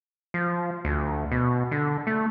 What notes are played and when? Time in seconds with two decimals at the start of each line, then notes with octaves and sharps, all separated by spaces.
0.34 F3
0.85 D2
1.32 B2
1.71 D3
2.07 A3